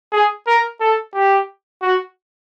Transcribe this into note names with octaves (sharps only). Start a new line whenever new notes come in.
G#4
A#4
A4
G4
F#4